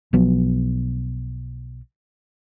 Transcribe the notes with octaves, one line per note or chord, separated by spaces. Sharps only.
B1 F3 F#3 B3